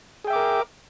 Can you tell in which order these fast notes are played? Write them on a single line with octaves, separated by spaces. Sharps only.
G#4 G5 E5 D6 A#4